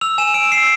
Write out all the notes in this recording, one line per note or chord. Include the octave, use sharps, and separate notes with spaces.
E6 F7
G#5 E7
E6 D7
E6 C7